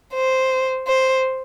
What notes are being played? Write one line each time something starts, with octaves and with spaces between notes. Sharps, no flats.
C5
C5